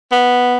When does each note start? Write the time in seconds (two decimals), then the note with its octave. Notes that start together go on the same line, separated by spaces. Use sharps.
0.12 B3